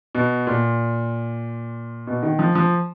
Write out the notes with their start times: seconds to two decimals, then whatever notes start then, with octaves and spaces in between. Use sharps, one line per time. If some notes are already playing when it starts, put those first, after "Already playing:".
0.15 B2
0.47 A#2
2.07 B2
2.23 D#3
2.39 F3
2.55 F3